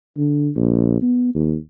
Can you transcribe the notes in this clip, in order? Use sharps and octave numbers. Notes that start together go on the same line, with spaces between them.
D3
A#1
B3
D#2